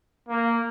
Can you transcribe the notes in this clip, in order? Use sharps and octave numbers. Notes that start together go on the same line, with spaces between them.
A#3